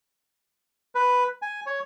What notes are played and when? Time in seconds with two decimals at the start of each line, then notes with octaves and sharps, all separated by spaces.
0.95 B4
1.42 G#5
1.66 C#5